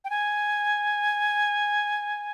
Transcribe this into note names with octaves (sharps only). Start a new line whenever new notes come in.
G5
G#5